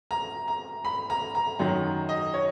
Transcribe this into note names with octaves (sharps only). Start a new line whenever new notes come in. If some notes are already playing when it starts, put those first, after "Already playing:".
A#5
A#5
B5
A#5
A#5
F#2 D#3 F#3 A#5
D#5
C#5